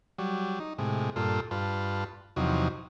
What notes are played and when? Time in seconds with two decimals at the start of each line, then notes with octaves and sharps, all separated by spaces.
0.18 F#3 G3
0.60 D#4
0.78 A2 C3 G#3
1.16 G2 A#2 F4 A4
1.51 G2 F4 B4 A5
2.36 E2 C3 F3 F#3 D#4